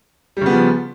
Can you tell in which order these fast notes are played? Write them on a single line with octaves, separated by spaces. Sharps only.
G3 C#3 B3 F3